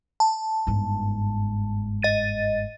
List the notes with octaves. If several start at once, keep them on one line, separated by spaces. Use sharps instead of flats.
A5
G1 G#2
D#5 A6 D#7